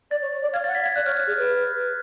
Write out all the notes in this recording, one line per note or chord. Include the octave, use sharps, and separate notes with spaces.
D5 A6
C#5
C#5
D5
F5 G#6
A6
F#5
B6
F5
G#6
D5 F#6
C#5 F6
F6
G#4
B4